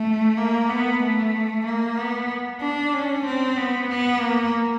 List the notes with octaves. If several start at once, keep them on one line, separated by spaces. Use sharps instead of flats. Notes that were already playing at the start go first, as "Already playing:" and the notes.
Already playing: A3
A#3
B3
A3
A#3
B3
D4
C#4
C4
B3
B3
A#3